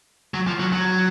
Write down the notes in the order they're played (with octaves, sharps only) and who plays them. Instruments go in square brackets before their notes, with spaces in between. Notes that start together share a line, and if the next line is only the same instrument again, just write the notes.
[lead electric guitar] F#3
F3
F#3
F#3